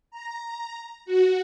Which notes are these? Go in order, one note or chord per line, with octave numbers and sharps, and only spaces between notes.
A#5
F#4